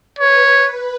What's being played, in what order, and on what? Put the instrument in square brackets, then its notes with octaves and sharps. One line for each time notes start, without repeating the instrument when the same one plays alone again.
[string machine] B4 [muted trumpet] C#5